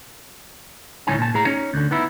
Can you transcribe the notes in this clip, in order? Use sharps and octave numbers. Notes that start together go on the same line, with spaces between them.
D2 A2 A3 C#4 D#4 G#5
A#2 A5
A2 G#4 A#5
C#4 D#4
D2 D3
B3 D#4 E4